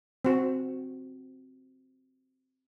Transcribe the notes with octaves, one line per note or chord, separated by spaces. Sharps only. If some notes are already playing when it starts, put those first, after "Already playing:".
C4 F#4